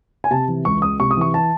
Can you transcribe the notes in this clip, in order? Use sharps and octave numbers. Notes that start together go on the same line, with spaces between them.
G#5
C3 A5
E3
C#2 C#6
C#2 D#6
C3 C#6
D#6
E3 C#6
A5